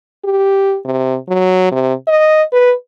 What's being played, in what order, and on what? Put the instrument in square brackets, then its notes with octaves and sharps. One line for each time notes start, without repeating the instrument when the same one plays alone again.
[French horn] G4
C3
F#3
C3
D#5
B4